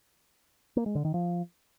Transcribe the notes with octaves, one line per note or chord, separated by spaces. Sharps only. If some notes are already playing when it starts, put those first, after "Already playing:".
A#3
G#3
D3
D#3
F3